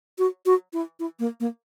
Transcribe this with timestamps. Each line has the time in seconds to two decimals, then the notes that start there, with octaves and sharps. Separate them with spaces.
0.18 F#4
0.46 F#4
0.73 E4
1.00 E4
1.19 A#3
1.40 A#3